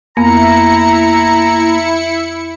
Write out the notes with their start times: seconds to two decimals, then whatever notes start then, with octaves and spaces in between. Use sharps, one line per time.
0.17 F2 A#3 B3 E4 A#5 C#7